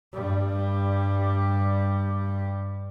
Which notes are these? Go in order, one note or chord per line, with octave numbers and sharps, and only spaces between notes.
G2 G3